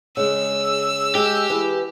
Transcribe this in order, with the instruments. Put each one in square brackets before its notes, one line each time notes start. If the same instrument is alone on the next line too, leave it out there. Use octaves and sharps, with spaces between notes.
[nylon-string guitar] C#3 G#3 [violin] E6
[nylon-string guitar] G#3 [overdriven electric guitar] G4
[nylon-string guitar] E3 G#4 B4